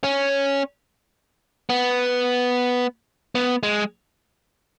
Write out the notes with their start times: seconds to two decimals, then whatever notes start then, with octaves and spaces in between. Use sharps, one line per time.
0.04 C#4
1.70 B3
3.35 B3
3.63 G#3